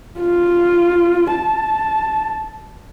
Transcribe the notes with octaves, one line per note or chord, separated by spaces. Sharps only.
F4
A5